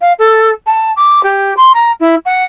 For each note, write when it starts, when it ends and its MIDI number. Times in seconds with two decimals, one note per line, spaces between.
0.01 0.13 77
0.19 0.51 69
0.66 0.92 81
0.96 1.22 86
1.23 1.54 67
1.57 1.72 84
1.74 1.92 82
2.00 2.15 64
2.25 2.44 78